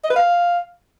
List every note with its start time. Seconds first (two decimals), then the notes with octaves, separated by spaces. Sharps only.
0.04 D#5
0.10 B4
0.16 F5